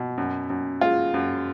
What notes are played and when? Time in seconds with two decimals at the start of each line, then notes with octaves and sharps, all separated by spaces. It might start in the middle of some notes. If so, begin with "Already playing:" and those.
Already playing: B2
0.18 F#2
0.50 F#2
0.81 G#3 F4
1.14 F#2